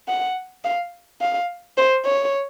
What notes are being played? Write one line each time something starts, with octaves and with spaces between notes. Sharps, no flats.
F#5
F5
F5
C5
C#5